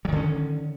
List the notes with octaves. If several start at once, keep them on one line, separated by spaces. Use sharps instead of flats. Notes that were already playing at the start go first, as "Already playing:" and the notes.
D3 D#3 F#3 C#4